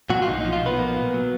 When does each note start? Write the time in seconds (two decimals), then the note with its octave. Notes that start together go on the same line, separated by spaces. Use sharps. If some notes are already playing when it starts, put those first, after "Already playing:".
0.10 A#2 F#3 F#4
0.22 F4
0.28 B1 D#4
0.41 D#4
0.45 F3
0.53 F4
0.62 B1 B3 B4
0.79 A#3
0.97 A#2
1.14 F#3